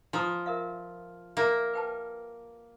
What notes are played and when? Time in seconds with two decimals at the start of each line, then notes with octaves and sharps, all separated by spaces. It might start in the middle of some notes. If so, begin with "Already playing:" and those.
0.13 F3 F4 A#5 D#6
0.46 A#4 E5 F5
1.37 A#3 E5 A#5
1.74 B4 G5 A5